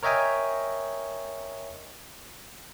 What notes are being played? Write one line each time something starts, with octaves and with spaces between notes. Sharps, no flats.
A#4 C#5 D#5 E5 G5 G#5